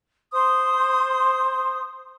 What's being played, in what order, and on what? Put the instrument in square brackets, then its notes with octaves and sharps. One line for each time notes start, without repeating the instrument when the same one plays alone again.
[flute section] C5 C6 D#6